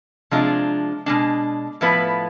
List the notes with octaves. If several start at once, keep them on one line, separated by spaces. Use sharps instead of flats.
C3 F3 G#3 D4 F4
B2 G#3 D4
A2 F3 B3 E4 B4